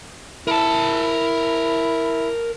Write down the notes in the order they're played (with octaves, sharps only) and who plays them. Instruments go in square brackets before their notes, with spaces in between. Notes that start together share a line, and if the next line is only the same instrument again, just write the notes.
[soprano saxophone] E4 [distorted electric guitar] A#4 A5